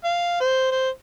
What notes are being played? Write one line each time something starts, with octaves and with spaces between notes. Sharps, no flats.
F5
C5
C5